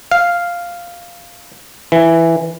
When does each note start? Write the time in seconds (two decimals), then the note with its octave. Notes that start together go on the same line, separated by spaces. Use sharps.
0.11 F5
1.92 E3